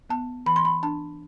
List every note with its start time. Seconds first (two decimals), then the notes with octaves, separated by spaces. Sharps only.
0.10 B3 A5
0.46 E3 B5
0.56 C6
0.65 B5
0.83 D4 A5